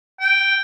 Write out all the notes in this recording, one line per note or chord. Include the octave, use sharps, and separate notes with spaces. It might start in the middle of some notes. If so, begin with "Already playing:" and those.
G5